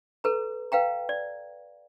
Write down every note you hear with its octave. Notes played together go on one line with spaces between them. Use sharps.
A4 B4 A#5
B4 F5 G5 A#5
D5